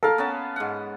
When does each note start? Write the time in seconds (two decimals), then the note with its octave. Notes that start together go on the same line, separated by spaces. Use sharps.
0.03 A4 A#4 F5
0.18 B3 C#4 A5
0.56 G#2 F#5